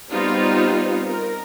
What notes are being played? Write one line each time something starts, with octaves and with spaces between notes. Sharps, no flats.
G3 B3 C4 D#4 F4
A#4